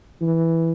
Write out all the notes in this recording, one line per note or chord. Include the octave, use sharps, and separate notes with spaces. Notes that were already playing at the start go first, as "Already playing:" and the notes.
E3